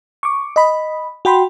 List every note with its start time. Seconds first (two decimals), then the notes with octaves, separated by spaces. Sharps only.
0.23 C#6 D6
0.56 D#5 B5
1.25 F#4 G5 B5 C6